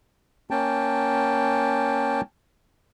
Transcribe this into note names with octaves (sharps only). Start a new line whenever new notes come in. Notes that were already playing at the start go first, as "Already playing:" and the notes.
A#3 C#4 G5 A5